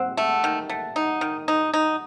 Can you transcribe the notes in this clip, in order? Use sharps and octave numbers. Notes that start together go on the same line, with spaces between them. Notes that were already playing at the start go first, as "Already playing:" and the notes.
Already playing: C4 F#5
A3
D#3
A3
D#4
D#3
D#4
D#4